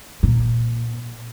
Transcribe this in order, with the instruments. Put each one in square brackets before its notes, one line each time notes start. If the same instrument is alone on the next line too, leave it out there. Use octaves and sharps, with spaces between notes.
[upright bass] A#2